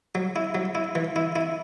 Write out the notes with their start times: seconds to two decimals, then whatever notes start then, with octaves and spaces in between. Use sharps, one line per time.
0.15 F#3
0.36 E4
0.55 F#3
0.75 E4
0.95 E3
1.16 E4
1.36 E4